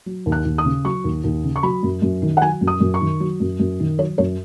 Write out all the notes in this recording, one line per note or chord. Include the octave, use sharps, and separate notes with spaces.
F#3
D#2
F#6
D#2
D#6
C#3
F#3 C#6
D#2
D#2
C#3
C#6
F#3 B5
F#2
F#2
D#3
F#5
F#3 G#5
F#2
D#6
F#2
C#6
D#3
F#3
F#2
F#2
D#3
F#3 C#5
F#2 C#5